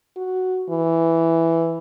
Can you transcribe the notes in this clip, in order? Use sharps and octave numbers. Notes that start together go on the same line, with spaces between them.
F#4
E3